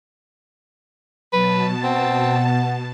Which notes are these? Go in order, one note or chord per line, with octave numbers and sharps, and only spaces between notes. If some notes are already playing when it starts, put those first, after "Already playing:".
B2 F#3 B4 A5
C4 F#5